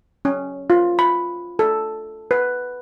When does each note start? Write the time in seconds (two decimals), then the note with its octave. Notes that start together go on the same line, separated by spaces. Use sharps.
0.25 C#4
0.70 F4
0.99 B5
1.59 A4
2.31 B4